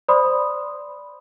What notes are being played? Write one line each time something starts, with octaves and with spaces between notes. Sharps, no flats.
C5 D5 B5 C6 D#6